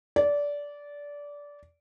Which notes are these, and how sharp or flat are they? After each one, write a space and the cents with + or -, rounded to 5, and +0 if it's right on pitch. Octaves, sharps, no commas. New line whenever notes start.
D5 -20